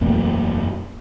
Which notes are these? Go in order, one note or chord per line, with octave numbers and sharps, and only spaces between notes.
E1 F#2 A3 A#3